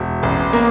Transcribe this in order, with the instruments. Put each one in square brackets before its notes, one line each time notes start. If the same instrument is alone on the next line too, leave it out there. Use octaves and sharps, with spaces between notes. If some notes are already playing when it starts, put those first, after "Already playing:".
Already playing: [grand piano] E1
A1
A#3